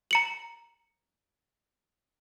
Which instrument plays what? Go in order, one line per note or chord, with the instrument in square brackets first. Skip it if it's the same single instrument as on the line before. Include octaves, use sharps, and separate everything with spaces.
[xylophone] A#5 C#7 F#7